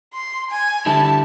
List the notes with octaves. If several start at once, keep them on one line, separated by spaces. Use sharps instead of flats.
C6
G#5
D3 G3 E4 A5